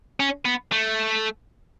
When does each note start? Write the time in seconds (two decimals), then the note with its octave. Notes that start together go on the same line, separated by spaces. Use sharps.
0.20 C#4
0.45 B3
0.72 A3